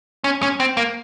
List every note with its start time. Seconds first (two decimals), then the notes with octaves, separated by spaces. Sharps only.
0.24 C#4
0.43 C#4
0.60 C4
0.77 A#3